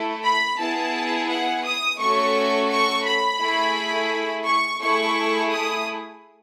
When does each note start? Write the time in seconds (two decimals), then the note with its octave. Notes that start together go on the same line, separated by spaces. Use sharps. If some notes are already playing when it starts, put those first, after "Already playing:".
Already playing: A3 E4 A4
0.24 B5
0.59 B3 E4 G#4 A5
1.30 F#5
1.65 D#6
2.00 A3 C#4 F#4 A4 C#6
2.70 C#6
3.05 B5
3.41 A3 E4 G#4
4.46 C#6
4.81 A3 E4 G#4 C#6
5.52 D#6